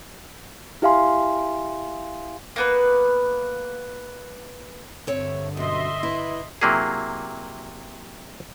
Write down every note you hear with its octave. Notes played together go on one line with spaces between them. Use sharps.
E4 G4 E5 F5 G#5 C6
A#3 B3 B4
G2 D3 C4 C#5 E5
F#2 B2 D#5 E5 C6
E4 B4
C3 F#3 A#3 E4 G#4